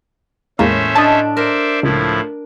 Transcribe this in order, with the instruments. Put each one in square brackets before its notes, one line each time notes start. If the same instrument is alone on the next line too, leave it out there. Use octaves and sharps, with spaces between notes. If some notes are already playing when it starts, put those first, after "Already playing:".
[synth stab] E2 G#3 A#3 [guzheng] A2 [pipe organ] C#4 C5 E5
[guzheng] D4 [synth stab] D#5 A5
[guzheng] A#4 [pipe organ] C5 D5 E5
[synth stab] C#2 [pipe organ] A2 F3 E4